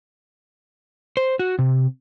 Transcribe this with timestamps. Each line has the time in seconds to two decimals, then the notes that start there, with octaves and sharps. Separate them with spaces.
1.17 C5
1.39 F#4
1.59 C3